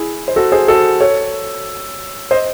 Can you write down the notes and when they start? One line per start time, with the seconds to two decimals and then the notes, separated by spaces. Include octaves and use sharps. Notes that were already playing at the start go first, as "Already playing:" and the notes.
Already playing: E4 G#4
0.28 C5
0.36 F#4 A4
0.52 G#4 C5
0.68 F#4 A4
1.00 A4 C#5
2.31 C5 D#5